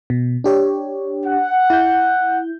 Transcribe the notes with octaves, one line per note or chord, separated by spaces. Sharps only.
B2
D4 G4 C#5
F#5
E4 G6